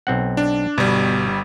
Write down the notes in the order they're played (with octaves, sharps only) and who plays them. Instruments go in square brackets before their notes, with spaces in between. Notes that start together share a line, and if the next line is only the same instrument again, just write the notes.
[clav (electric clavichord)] B1 C4 F#5
[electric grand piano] D4
[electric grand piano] G1 G3 [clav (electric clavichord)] B2